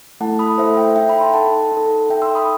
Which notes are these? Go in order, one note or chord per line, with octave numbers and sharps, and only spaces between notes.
A3 E4 A4 F#5 A5
B5 D#6
A3 E4 A4 C5 E5
E5 G5
D#4 A4 E5 G5
G5 B5
A5 C6
D#4 A4 F#5 A5
D#4 A4
D#4 A4 E5 G5
C6 E6
B5 D#6